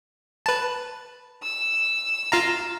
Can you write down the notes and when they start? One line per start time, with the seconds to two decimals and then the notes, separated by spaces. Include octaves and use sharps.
0.46 B4 A5
1.42 E6
2.32 F4 F5 A#5